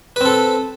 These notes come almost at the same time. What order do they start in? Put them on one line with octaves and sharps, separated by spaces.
B4 C4 A4